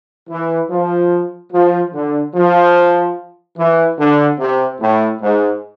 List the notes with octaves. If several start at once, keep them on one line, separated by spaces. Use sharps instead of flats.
E3
F3
F3
D3
F3
E3
D3
C3
A2
G#2